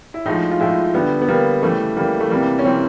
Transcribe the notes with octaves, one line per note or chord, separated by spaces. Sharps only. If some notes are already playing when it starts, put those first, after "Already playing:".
E4
A2 F3 G#3 D#4
F4
A2 F3 G#3 E4
D3 G3 B3
B3
D3 G3 A#3
C#3 E3 G3 A3
C#3 E3 G3 A#3
A3
C3 E3 G3 A#3
C#4
C3 E3 G3 C4